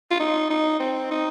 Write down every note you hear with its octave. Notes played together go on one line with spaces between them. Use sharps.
F4
D#4
D#4
C4
D#4